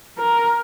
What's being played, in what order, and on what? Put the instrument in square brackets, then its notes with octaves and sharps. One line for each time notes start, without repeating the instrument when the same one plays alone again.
[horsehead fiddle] A#4